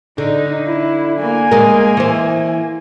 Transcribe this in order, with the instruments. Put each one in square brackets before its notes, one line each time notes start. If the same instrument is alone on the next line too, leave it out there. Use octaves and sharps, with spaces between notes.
[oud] D3 [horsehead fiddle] D#4
[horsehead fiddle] E4
A#3 G#5
[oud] G#3 A#4
E3 C5